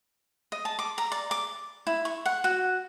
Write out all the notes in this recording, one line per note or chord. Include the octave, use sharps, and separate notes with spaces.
D#5
A5
D6
A#5
D5
D6
E4
C#6
F#5
F#4